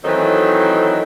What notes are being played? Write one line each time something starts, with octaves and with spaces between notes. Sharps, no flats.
D#3 E3 F#3 A3 C4 D#4